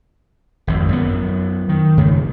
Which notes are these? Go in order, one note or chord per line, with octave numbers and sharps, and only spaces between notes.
G#1 F2
F#2 B3
D#3
G2 C#3 A3